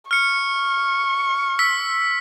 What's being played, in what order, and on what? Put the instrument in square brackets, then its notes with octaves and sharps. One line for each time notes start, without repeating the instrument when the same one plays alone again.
[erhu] C#6 [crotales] F6 C#7
[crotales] E6 B6